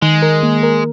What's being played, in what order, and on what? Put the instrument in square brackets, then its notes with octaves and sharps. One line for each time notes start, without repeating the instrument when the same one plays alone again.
[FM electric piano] D#3 [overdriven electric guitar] G#3
[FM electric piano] A#4
A#3
A#4